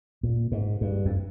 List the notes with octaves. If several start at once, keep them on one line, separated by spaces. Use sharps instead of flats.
A#2
G#2
G2
F2